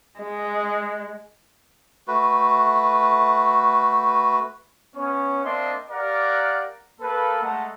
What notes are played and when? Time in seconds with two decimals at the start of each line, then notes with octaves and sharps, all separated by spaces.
0.19 G#3
2.08 A3 F#4 B4
4.96 B3 C#4 C#5
5.44 A#3 C4 D4 D#5 E5 C6
5.90 G4 A#4 D5 F5 F#5
7.01 A#3 A4 B4
7.43 G#3 A3 F#5 A5 A#5